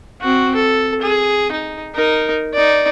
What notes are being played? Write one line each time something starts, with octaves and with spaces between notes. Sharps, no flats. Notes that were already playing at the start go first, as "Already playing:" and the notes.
C4 F#4
A4
G#4
D#4
D#4 A#4
D#4 D5